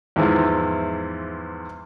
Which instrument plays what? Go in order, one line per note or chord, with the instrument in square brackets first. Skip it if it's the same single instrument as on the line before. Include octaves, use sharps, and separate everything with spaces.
[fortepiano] E2 G#2 E3 F3